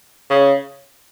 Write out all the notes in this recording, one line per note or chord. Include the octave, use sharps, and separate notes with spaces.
C#3